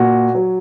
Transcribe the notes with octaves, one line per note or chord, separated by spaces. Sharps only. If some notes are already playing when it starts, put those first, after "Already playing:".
Already playing: A#2 F#4
F#3